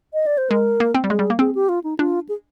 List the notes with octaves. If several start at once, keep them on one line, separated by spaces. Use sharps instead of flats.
D#5
D5
C5
G#3 A#4
A#3
C4
G3
G#3 G#4
G3
A#3
C4 G#4
G4
F4
D#4
D4 F4
G#4